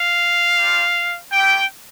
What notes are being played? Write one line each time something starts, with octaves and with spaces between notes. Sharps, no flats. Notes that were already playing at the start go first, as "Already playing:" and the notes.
Already playing: F5
G3 D4 F4
A3 E4 G4 G5